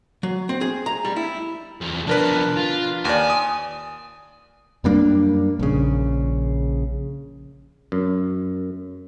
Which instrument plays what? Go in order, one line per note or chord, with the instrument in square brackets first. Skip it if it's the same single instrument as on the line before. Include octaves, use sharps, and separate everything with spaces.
[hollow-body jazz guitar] F#3
C4
G#4
A#5
G3
E4
[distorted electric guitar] E2 F3
[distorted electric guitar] B2 F3 [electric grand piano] D4 A#4 B4
[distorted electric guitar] F4
[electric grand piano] D#2 D5 [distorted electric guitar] G#5
[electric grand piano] D#6
[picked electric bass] F#2 G3 A#3 D4
A#1 C#3
[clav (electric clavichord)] F#2